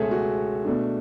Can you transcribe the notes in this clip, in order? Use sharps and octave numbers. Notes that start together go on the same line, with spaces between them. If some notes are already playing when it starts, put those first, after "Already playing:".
Already playing: C#2 B2 A3 C#4 G#4 A4 E5
F#4
B2 A3 D4